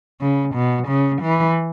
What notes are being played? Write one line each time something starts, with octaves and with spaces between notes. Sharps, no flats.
C#3
B2
C#3
E3